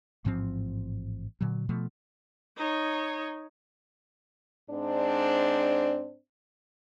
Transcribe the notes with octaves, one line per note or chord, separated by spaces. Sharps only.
A1 G#2 F3 C4
A#2 D3 F#3
B2 F3 A3
D#4 C#5
G#2 C4 D4